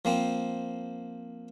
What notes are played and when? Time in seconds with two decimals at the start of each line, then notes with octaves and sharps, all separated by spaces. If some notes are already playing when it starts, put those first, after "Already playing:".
0.05 F3 A#3 C4